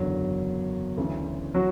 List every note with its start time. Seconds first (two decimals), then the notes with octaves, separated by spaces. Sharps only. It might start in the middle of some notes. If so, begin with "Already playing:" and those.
Already playing: F#1 E2 D3 F#3
0.97 D2 C#3 E3
1.55 F#3 F#4